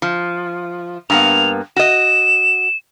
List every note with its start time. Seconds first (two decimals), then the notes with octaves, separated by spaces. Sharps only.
0.02 F3
1.10 G2 A#3 B3 F7
1.76 F#4 D#5 E7